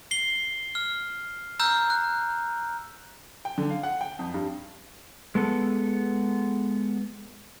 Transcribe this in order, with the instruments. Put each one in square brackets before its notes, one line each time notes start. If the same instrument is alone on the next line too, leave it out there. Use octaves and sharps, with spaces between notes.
[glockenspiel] C7 G7
F6
A#5 E6 F6 G6
F#6
[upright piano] G5
D3
F5
F#5
G5
F2
G2
[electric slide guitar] G#3 B3 A4